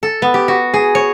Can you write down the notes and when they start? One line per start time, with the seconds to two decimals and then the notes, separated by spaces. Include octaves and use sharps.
0.03 A4
0.22 B3
0.34 G4
0.48 F#4
0.74 G#4
0.95 C#5